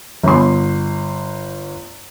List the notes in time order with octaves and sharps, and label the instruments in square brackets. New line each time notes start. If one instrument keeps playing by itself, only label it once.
[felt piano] G1 C6